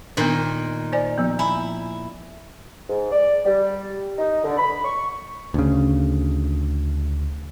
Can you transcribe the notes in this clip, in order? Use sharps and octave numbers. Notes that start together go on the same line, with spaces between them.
A#2 D#3 B3 D4 C6
C5 D5 G#5
F3 B3
E4 G#5
G#2
D5
G3
D#4
D3
B5
C#6
D2 C#3